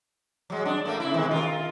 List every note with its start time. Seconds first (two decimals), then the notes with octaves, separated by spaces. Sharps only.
0.50 F#3 G#3
0.65 D4
0.85 A3 A#3
1.00 C#3 E4
1.14 B2 D#3 G#3
1.31 F4 A#4